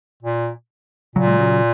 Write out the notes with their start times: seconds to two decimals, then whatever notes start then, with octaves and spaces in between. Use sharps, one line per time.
0.23 A#2
1.16 A#2 C#3 F#3
1.27 G#3
1.39 C#3 F#3